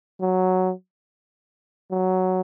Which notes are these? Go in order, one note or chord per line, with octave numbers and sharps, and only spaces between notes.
F#3
F#3